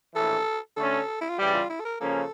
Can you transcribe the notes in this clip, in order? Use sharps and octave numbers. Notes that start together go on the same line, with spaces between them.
A#1 A2 E3 A4
D3 A3 C#4 A4
E4
F4
C#3 E3 G3 G4
F4
E4
A4
A#4
C#3 F3 A#3 C#4 A4